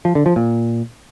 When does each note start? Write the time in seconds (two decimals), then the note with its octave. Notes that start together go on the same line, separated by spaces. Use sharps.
0.05 F3
0.15 D3
0.26 F3
0.36 A#2